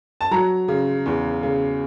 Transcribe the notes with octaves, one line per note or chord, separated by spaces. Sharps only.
A5
F#3 A#5
C#3
E2
C#3